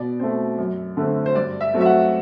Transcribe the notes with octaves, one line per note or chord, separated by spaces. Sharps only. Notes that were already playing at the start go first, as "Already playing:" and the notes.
Already playing: B2 D5
A3 C4
F#2
D3 A3 C4
C5
G2 D5
E5
F#3 A3 C4
E5
F#5